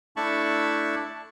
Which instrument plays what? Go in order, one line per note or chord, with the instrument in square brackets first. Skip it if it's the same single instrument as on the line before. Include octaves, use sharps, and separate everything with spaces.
[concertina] A3 D4 E4 A5 B5 C#6